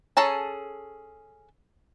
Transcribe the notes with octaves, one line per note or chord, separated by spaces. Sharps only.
C#4 G#4 A4 A5 A#5